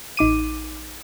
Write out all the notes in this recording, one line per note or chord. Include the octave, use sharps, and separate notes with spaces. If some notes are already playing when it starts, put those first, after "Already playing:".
A1 D#4 D6 D#7